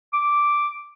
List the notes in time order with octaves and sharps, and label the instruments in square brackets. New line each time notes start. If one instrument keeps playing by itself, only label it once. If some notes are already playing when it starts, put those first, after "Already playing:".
[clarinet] D6